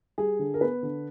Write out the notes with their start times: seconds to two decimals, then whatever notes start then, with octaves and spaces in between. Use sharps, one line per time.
0.18 G3 G#4
0.39 D3
0.54 A#4
0.61 B3 B4
0.83 D3